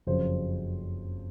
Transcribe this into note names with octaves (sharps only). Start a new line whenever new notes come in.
F#1 F2 C#3 F#3 C5